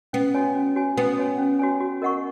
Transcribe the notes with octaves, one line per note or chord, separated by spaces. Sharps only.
B3 C#4
F#4 C#5 G#5
C#4
F#4 C#5 G#5
B3 C#4
F#4 C#5 G#5
C#4
F#4 C#5 G#5
F#4
A#4 D#5 F#5 C#6